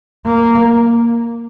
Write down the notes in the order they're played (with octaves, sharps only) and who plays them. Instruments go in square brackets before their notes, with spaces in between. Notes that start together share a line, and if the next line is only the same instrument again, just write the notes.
[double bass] A#3